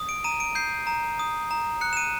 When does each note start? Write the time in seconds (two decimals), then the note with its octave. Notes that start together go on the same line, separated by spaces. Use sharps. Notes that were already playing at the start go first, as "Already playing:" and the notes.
Already playing: D#6
0.09 D7
0.24 A#5 D#7
0.40 D7
0.55 G6 C7
0.87 A#5
1.19 D#6
1.51 A#5
1.81 F#6 C#7
1.93 E7
1.97 D#7